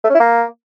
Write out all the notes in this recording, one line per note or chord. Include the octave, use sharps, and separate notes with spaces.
A3
C#4
E4
A#3